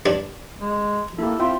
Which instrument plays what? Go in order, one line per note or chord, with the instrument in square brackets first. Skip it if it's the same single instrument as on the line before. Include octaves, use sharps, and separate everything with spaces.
[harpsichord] G2 D4
[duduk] G#3
[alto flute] A#3 [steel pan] E4 G4 [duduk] A4
[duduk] C4 [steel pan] F4 E5 G5 [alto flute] C6